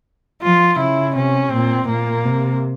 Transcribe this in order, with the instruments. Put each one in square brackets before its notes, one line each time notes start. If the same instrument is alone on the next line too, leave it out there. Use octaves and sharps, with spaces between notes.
[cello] F3 [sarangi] F4
[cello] C#3 [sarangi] E4
[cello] C3 [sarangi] C#4
[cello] A#2 [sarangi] C4
[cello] A#2 [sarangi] A#3
[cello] C3